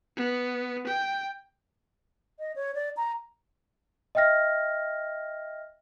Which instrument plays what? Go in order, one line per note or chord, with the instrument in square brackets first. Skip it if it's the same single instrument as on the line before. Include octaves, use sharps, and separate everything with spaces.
[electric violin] B3
G5
[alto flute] D#5
C#5
D5
A#5
[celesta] D#5 E5 G5 F6 A#6